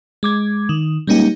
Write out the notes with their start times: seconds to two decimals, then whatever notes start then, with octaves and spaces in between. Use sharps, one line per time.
0.23 G#3 D6 G#6
0.69 D#3
1.07 G3 G#3 A#3 C#4 D#4 G4